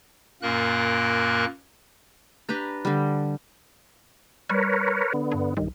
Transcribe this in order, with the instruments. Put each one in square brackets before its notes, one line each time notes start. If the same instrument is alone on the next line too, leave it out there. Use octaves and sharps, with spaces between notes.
[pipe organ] F#2 A#2 A#3 A#4 F#6
[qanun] D4 G4 B4 A#5
D3 G3
[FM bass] G3 [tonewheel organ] A#4 B4 C#5
[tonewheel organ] D3 B3
[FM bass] G2
[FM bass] B1 [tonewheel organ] G2 D#3